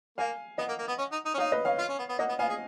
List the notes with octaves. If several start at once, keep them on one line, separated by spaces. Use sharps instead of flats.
A#3 F5 G#5
B3 D#5 F#5
A#3
A#3
B3
C#4
D#4
D#4
C#4
D#4 C#5 F5
B4 D#5
C#5 F5
F4
C#4
B3
B3
A#3 D#5 F#5
B3
B3 F5 G#5
G#4